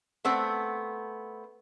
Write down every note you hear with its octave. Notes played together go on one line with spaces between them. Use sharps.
A3 B3 C4